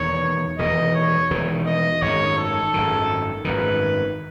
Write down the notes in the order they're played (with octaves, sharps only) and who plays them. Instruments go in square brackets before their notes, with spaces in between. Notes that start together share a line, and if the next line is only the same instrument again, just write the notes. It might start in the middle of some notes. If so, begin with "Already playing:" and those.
Already playing: [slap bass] E1 E2 D#3 [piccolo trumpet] C#5
[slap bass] E1 E2 D#3 [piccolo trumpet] D#5
[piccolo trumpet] C#5
[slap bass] E1 E2 D#3
[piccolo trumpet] D#5
[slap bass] G#1 F#2 D#3 [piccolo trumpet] C#5
[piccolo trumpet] A4
[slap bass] G#1 F#2 D#3
[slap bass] G#1 F#2 D#3 [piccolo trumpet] B4